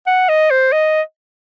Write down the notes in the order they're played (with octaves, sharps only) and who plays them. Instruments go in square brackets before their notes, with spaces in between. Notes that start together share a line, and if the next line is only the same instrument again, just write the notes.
[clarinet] F#5
D#5
C5
D#5